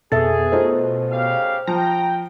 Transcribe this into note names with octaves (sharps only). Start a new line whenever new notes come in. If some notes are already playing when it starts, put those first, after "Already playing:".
F2 B2 G#4 A4 E5 A6
A3 D#4 F4 C5
C#3 G4 F5
F3 G5 A#5